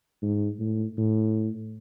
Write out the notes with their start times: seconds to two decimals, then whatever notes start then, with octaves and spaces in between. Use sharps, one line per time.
0.22 G#2
0.59 A2
0.98 A2